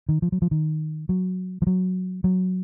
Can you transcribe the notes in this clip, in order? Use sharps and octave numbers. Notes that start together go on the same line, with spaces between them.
D#3
F3
F#3
F3
D#3
F#3
F3
F#3
F#3